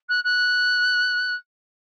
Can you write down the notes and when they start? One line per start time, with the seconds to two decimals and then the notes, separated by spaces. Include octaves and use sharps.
0.09 F#6
0.24 F#6